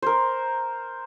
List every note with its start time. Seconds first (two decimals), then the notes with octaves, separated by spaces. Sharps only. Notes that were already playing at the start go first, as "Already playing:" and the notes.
0.02 A#4 C5